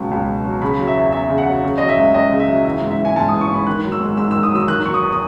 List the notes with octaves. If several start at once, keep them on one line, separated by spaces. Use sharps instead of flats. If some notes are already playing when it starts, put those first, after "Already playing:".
Already playing: C#2 B2 F#3
C#2
B2
F#3
C#3 B5
F#3
E5
E2
E2 E5
C#3
F#5
F#3
C#3
F#3 D#5
E5
C#2
C#2 D#5
C#3
E5
F#3
E3 E5
G#2
E5
E3
G#5
G#2 A5
E3 D#6
C#6
G#2 B5
D#3 F#6
F#3
E6
G#2
G#2 E6
D#3 E6
D#6
F#3 E6
D#3 F#6
F#3 C#6
D#6
E2
D#6